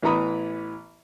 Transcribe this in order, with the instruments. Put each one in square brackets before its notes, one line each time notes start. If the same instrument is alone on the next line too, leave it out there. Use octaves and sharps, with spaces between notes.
[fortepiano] A1 E3 B3 A#5 B5 D#6